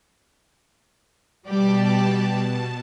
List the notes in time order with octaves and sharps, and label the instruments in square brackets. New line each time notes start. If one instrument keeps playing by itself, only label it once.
[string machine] B2 A5 [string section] G3 G4 D5